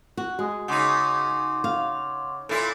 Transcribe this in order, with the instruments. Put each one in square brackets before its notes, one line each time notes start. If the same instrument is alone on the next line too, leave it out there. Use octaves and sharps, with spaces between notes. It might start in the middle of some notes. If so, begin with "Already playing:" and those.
[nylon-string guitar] F#4
[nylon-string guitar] G#3 [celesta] F#4 D#6
[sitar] C#3 D#4 [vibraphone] F#5 C6 D6
[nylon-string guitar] F5
[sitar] A#2 E4 [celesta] A4 C6